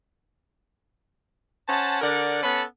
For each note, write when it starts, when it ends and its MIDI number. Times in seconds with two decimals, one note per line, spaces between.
1.68 1.98 61
1.68 1.98 72
1.68 1.98 78
1.68 1.98 81
2.01 2.39 50
2.01 2.39 70
2.01 2.39 74
2.01 2.39 78
2.43 2.63 59
2.43 2.63 61
2.43 2.63 69
2.43 2.63 81
2.43 2.63 83